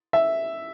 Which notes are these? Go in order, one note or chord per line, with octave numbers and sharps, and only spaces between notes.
E5